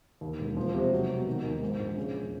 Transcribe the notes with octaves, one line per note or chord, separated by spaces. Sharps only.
D#2
E1
F3
C3
F#3
B2
D#3
D#2
G#2
A#1
C#3
E2